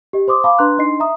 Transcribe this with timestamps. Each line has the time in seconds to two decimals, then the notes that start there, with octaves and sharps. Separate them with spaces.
0.13 G4 D#5
0.28 C5 C6 D6 D#6
0.44 F5 A5 B5 D6
0.59 D4 B4 A#5 C6 F#6
0.78 D4 D#4 D#5 C6 C7
1.00 E5 A#5 D#6